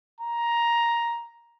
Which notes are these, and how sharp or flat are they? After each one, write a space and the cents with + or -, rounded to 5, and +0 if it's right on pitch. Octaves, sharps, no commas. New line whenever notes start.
A#5 +10